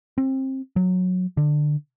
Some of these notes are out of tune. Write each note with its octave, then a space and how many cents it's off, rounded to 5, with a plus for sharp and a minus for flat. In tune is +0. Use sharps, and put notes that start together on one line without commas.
C4 +25
F#3 -15
D3 +20